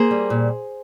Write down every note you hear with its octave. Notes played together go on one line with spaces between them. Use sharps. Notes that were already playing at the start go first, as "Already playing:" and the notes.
Already playing: A#3 G#4 C5
G3
A#2